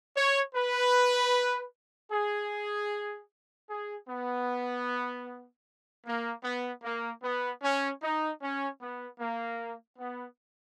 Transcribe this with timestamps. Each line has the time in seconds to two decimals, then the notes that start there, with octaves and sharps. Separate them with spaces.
0.15 C#5
0.55 B4
2.12 G#4
3.70 G#4
4.09 B3
6.06 A#3
6.44 B3
6.83 A#3
7.23 B3
7.63 C#4
8.02 D#4
8.42 C#4
8.81 B3
9.20 A#3
9.99 B3